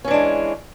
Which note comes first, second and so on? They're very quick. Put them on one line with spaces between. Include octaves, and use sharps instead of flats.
C#4 E3 D4 G#3